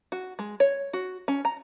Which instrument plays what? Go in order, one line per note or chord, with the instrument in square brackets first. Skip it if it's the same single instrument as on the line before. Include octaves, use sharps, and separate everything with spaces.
[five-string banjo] F#4
G#3
C#5
F#4
C#4
A#5